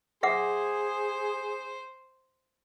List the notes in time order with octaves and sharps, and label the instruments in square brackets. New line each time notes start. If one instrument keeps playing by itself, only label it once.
[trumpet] G#4 [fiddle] C5 [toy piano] E5 F#5 D6